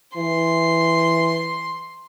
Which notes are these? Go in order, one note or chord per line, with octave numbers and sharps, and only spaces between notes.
E3 C6